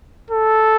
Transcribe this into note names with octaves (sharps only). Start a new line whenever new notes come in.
A4